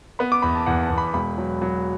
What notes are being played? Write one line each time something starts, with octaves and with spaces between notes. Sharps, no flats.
B3 B5
D6
E2 B5
A5
E2 F#5
A5
E2
B5
E1 B5
F#3
F#3